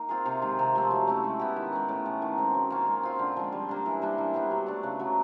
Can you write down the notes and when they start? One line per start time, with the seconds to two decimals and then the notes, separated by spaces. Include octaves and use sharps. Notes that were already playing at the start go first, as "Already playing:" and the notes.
Already playing: A#3 D#4
0.09 C4 F4 G#4
0.26 C3
0.42 D#3 G#3
0.59 C3
0.75 F3 A3 C4
0.91 F#3
1.07 A3 C#4 E4
1.24 G#3
1.39 B3 E4 G4
1.56 D#3
1.72 G#3 C#4
1.89 A2
2.06 E3 A3
2.22 D#3
2.38 G#3 C4
2.54 F#3
2.70 A#3 C#4 F4
2.87 G#3
3.03 C4 F4
3.19 D3
3.36 F3 G#3
3.52 G3
3.69 A#3 D4
3.86 E3
4.02 G3 A#3 D4
4.18 E3
4.34 G3 B3 D4
4.51 F#3
4.67 A3 D4
4.83 C#3
5.00 F#3 B3